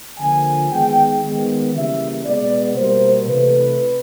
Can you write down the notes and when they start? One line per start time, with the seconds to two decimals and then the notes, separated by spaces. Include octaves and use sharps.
0.19 D3 F3 A#3 G#5
0.71 D#3 G#3 B3 G5
1.22 D#3 G#3 B3
1.73 C#3 E3 G3 A#3 E5
2.25 B2 G#3 B3 D5
2.76 B2 G3 A#3 C5
3.27 C3 E3 A3 B4